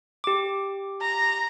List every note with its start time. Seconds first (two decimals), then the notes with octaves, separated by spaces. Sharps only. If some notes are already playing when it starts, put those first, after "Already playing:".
0.24 G4 D6
1.01 A#5